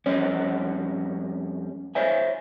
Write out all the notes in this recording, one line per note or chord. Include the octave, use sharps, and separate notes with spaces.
F2 G3 C#4 C#5
C5 C#5 E5 G#5